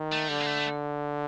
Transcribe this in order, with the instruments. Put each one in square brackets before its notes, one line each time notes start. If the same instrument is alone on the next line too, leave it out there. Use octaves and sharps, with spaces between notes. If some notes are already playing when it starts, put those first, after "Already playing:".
Already playing: [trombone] D#3
[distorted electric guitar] A3
[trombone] D3 [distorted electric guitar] G3
[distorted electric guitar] A#3
A3